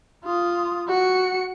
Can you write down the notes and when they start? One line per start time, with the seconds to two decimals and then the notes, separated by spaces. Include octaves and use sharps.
0.25 F4 D#6
0.88 F#4 C#7